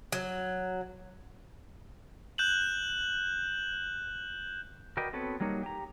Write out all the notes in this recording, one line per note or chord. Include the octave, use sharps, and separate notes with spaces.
F#3
F#6 G6 E7 F#7
F#4 A#4 B4 D5 D#5 G5
B3 C4 F#4 A4 B4 C#5
F#3 G3 A#3 D#4 C#5
G4 A#5